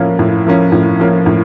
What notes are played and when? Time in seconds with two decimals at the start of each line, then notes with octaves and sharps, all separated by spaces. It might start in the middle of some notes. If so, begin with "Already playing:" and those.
Already playing: A2 F3 A#3 C#4
0.19 A2
0.47 F3 A#3 C#4
0.72 A2
0.99 F3 A#3 C#4
1.26 A2